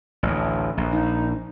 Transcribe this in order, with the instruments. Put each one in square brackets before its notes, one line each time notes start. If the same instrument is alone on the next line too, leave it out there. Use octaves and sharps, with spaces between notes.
[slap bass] A1 D2
A#1
[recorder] D#4